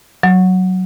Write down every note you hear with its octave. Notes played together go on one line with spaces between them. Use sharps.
F#3